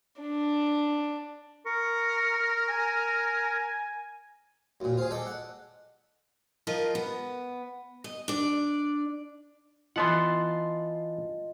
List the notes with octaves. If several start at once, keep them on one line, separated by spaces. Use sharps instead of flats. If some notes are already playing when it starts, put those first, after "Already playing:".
D4
A#4 C#6
G#5
D#2 A#2 F#4
F4 G#4 C5
A4 D5 D#5 G5
F#5
F3 F4 A#4 D#5
B3
D#5
D4 D5
E3 B3 F4 D#5 F#5 A5 C6